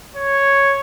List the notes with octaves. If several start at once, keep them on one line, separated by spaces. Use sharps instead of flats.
C#5